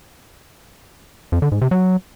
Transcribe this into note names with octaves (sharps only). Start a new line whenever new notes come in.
F2
D3
G#2
C3
F#3